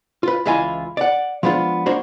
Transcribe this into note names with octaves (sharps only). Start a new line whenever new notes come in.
F4 B4
C#2 E3 G#3 E4 F4 G#5
D5 F#5
F3 G#3 B3 D4 F4
A#3 D4 F#4 C5